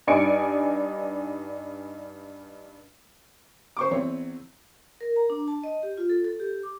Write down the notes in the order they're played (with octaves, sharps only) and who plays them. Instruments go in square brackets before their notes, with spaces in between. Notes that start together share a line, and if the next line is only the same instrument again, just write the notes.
[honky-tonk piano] G2 D#4 D5 G#5 C#7 D7
[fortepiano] C5 C#6 D6
E2 C4 C#5
[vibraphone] A#4
A#5
D4
A5
D#5
G4
F4
A4
A4
G4
D6